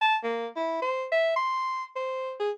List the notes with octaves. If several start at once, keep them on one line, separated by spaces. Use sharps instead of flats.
A5
A#3
E4
C5
E5
C6
C5
G#4